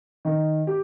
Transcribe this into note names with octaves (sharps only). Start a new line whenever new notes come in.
D#3
G4